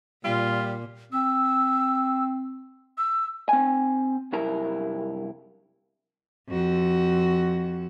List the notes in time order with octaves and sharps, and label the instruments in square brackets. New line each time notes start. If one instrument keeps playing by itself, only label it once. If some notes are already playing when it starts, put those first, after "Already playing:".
[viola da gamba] A#2 [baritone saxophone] G3 [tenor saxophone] F4
[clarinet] C4 [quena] E6
[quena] E6
[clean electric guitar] C4 G#5
C2 F#2 E4 A#4 A#5
[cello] F2 F#4